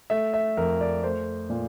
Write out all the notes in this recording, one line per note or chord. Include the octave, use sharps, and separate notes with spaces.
A3 E5
E5
F2 A#4
D5
A3 C5
A#2